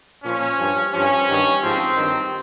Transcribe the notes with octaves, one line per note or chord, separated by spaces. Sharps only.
A#2 F3 C#4
G2 F3
G2 F3 C#4
G2 D#3
G#2 F3 C4
G2 D#3